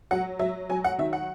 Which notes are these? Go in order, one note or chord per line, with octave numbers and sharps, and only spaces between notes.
F#3 F#5
F#3 E5
F#3 G#5
F#5
D#3 E5
F#5